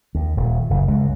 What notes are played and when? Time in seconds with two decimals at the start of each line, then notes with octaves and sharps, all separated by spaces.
0.15 D#2
0.37 D#1
0.70 F#1
0.88 C#2